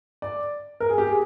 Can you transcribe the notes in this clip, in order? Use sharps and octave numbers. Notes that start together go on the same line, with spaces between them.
D5
A#4
G#4
G4
G#4